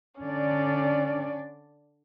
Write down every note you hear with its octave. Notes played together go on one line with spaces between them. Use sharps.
D3 C#4 D4 D5